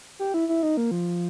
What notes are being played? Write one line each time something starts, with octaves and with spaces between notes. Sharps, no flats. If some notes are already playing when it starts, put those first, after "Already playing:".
G4
E4
E4
D#4
A#3
F3